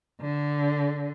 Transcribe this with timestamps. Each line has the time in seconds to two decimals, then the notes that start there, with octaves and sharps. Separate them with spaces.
0.20 D3